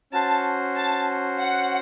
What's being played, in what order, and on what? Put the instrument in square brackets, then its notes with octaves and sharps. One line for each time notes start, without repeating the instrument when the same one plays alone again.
[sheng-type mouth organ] C#4 F#4 C5 [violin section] A5
[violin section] A5
F#5